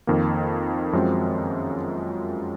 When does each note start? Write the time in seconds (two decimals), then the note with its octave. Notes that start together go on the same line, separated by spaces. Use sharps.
0.07 F2 D#3 A#3
0.93 F#2 F3 G#3 C4 F#4